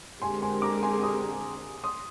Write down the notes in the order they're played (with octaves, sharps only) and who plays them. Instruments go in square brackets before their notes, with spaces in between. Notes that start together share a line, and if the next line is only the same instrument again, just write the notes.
[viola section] D3 G#3 C4 G4 A#4 [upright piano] G#5 C6
[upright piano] G#5 C6
A#5 D6
G#5 C6
C6 D#6
C6 D#6